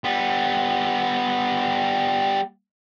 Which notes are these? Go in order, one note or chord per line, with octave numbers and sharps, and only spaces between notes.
G3 B3